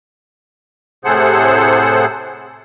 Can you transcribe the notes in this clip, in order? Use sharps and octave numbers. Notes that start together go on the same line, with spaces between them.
A2 C3 G#4 A4 C5 F#5